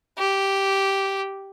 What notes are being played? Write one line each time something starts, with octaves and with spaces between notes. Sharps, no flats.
G4